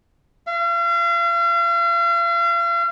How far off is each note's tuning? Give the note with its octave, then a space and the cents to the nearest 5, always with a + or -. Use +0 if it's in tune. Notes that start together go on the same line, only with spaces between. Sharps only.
F5 -40